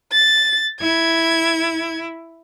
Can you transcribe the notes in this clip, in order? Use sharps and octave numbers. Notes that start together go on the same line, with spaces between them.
A6
E4 G#6